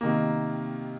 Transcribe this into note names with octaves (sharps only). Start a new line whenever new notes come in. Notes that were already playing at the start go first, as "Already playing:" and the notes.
C3 D#3 A#3